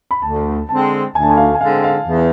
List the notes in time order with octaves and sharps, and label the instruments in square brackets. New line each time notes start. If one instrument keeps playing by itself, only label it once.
[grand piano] B5
[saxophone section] D2 [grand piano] A5
[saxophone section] D3 G#3 C4 [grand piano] A5
[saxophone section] D2 [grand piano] G#5
[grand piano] A5
G#5
F5
G#5
[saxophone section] D3 G#3 C4 [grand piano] F5
[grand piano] F5
[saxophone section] E2